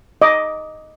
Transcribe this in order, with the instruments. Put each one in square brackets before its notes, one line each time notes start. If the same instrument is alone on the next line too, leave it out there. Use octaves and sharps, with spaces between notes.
[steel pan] D#5 D6